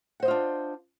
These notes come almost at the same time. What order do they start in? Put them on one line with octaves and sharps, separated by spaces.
F#5 C5 D#5 F4 D4